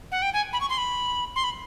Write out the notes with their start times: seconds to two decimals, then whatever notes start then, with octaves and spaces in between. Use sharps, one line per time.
0.12 F#5
0.22 G5
0.34 G#5
0.53 B5
0.60 C#6
0.70 C6
0.78 B5
1.36 C6
1.44 B5